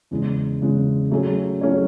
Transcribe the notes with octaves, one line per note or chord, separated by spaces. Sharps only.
E2 C#3 G#3
E2 C#3 G#3
F#3 A3 C#4 G#4 C#5
F#3 A3 C#4 G#4 C#5